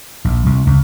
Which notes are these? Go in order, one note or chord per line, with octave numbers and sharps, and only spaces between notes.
A#1
C2
C#2